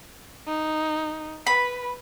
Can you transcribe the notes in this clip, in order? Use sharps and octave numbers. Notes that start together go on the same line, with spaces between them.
D#4
B4 B5